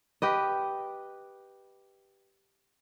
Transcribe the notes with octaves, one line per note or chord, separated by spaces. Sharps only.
G4 B4 D#5